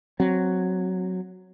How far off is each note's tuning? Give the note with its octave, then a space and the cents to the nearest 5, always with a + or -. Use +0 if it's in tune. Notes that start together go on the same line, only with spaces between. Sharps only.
F#3 +0 C4 +0